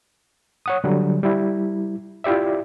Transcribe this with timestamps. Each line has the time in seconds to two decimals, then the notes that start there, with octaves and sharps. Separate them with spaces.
0.66 C#5 F#5 D#6
0.84 D3 F#3 G3
1.23 G3 E4
2.24 E4 F4 G4 D5 E5